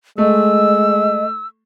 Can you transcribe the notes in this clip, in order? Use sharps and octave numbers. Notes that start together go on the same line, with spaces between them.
G#3 A3 D#5 E6